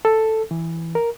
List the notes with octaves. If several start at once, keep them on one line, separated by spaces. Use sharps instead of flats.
A4
E3
A#4